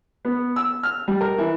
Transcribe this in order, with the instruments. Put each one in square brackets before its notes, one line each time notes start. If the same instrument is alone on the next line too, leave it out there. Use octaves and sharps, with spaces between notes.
[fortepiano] B3
E6
F6
G3
A#4
E3